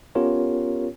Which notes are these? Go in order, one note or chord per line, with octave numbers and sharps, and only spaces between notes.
B3 C#4 F4 G4 A#4 C#5